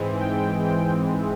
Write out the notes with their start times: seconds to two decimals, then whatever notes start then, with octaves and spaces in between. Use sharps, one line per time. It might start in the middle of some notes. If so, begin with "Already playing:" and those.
Already playing: G#2 E3 G#3 C4
0.20 G5